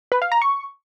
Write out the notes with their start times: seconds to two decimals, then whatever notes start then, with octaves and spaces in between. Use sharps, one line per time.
0.12 B4
0.22 F5
0.32 A#5
0.42 C#6